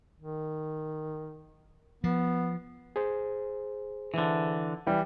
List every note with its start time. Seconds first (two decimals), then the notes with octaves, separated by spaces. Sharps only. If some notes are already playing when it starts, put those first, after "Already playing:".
0.20 D#3
2.04 F3 B3
2.96 G#4 C5
4.14 D3 E3
4.86 E3 G3